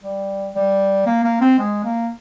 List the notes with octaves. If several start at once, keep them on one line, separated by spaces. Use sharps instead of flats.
G3
G3
A#3
A#3
C4
G#3
A#3